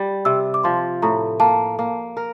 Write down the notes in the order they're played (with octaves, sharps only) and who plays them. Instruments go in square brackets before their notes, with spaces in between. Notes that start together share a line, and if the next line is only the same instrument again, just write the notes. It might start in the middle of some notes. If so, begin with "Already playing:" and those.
Already playing: [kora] G3
[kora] C3 [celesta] E6
[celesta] D6
[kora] F3 [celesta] C6
[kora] A2 [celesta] A#5
[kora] A#3 [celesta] A5
[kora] A#3
A#4